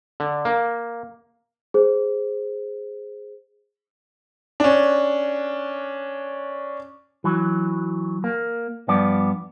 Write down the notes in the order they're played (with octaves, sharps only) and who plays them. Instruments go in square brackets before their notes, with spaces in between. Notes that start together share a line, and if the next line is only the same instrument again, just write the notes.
[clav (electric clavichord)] D3
A#3
[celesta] G#4 C5
[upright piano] C#4 D4
[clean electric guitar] E3 F#3
A#3
G2 F3 B3 D5